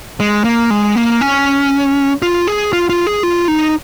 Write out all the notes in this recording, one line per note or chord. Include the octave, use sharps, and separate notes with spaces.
G#3
A#3
G#3
A#3
C#4
F4
G#4
F4
F4
G#4
F4
D#4